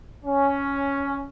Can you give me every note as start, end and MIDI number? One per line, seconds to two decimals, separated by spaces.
0.25 1.28 61